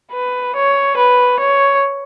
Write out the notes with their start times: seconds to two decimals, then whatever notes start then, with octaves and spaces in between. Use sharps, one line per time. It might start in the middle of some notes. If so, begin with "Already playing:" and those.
0.12 B4
0.56 C#5
0.97 B4
1.39 C#5